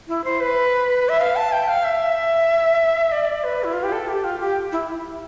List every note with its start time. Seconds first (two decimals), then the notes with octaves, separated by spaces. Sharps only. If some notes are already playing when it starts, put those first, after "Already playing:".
0.08 E4
0.24 C5
0.40 B4
1.09 E5
1.21 F5
1.36 A5
1.52 G5
1.69 F5
1.84 E5
3.12 D5
3.44 B4
3.64 E4
3.73 F4
3.83 G4
3.92 A4
4.08 G4
4.24 F4
4.40 G4
4.72 E4